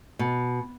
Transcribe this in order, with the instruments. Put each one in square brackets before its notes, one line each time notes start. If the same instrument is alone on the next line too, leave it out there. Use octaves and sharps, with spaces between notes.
[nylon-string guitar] B2